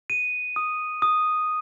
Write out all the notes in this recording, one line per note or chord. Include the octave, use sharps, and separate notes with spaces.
D#7
D#6
D#6